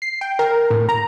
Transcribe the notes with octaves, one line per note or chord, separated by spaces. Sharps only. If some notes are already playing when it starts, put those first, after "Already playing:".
C7
G5
A#4
A2
A#5